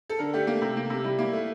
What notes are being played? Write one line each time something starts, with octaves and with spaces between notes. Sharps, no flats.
A4
D3 A#4
A3 G4
A#3
C3
A#3
C3
G3 E4
A#3 E4
A3